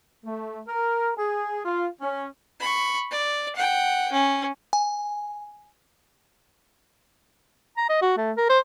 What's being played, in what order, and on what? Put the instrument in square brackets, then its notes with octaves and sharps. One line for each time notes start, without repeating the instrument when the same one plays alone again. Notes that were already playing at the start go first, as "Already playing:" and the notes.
[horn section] A3
A#4
G#4
F4
C#4
[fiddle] B5 C#6
D5
F#5 G5
C#4
[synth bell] G#5
[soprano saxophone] A#5
D#5
F#4
A3
A#4
C5